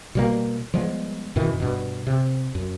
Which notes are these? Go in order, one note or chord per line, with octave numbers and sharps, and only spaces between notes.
B2 G3 A#3
F3 G3 G#3 B3
F#2 B2 D#3 E3
G2 B2
C3
F#2